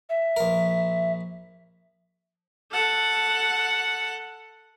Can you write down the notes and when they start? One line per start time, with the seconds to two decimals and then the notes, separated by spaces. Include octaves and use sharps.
0.09 E5
0.36 A#1 A#4
2.71 A4 F#5